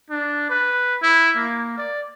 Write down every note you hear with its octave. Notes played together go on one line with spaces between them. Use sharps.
D4
B4
E4
A#3
D5